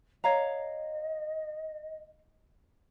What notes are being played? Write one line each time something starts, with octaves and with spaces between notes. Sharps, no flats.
C#5 D#5 F5 A#5